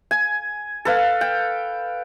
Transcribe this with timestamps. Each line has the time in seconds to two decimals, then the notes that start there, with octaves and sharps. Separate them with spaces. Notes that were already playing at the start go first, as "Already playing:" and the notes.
0.11 G#5
0.85 A4 B4 F5
1.21 G5